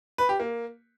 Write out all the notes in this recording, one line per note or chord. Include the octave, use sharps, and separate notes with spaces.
B4
G4
A#3